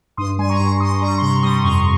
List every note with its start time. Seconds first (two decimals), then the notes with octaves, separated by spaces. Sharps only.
0.17 G2 C6 D#6
0.39 G3 G#5 C6
0.49 A#5 C#6
0.60 G2 A#5 C#6
0.80 G2 C6 D#6
1.01 G3 A#5 C#6
1.18 C6
1.22 C3 A#5 C#6
1.43 G3 C6 D#6
1.64 F2 A#5 C#6